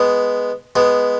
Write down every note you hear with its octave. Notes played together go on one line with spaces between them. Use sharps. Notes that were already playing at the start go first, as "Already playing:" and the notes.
Already playing: G#3 B3
G#3 B3